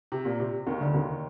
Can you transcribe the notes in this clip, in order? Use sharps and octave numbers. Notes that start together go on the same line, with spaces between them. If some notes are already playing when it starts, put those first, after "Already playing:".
C3
A#2
C3
D#2 D#3
D2 D3
D#2 D#3